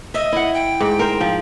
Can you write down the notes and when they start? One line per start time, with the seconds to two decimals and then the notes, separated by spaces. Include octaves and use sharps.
0.14 D#5 E5
0.33 E4 F#5
0.54 G5
0.80 G#2
0.99 A#4 C5
1.21 F3